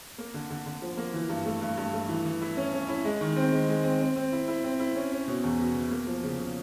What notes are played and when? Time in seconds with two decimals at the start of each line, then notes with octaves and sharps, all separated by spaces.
0.18 A#3
0.34 D3
0.50 D3
0.66 D3
0.82 F3
0.97 A#3
1.14 E3
1.29 G2
1.46 A3
1.62 G2
1.77 G2
1.93 A3
2.09 E3
2.25 E3
2.41 E4
2.57 C#4
2.73 C#4
2.89 E4
3.04 G#3
3.21 D#3
3.36 C4
3.52 G#3
3.68 G#3
3.84 C4
4.00 C4
4.16 C4
4.32 E4
4.48 E4
4.64 C4
4.80 E4
4.96 C#4
5.12 C#4
5.28 B2
5.44 E2
5.59 B2
5.75 B2
5.91 A#3
6.07 F3
6.23 C#3
6.39 C#3